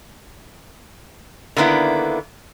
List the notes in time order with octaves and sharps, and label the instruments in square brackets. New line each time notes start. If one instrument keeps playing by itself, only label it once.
[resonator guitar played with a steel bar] D3 D#3 A#3 B3 E4